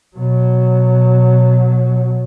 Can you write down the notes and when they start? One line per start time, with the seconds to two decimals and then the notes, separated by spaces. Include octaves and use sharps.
0.17 B2 F#3